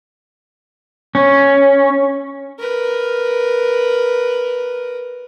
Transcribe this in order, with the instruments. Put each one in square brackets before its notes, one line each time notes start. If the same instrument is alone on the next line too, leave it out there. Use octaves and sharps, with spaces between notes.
[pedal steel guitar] C#4
[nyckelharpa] A#4 B4